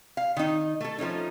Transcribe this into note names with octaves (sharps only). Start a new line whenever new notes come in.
F5
D#3 D#4
A3 A4
F3 A3 C#4 D#4